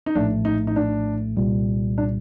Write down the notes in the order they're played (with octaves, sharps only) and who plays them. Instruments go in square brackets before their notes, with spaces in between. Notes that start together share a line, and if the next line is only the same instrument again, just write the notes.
[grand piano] D#4
[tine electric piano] A#1 A2 A3 [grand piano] D4
[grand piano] D#4
D#4
D4
[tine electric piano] C2 A#2 G3
[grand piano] D4